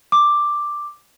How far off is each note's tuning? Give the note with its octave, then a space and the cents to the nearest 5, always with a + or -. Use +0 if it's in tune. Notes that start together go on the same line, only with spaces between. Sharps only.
D6 +5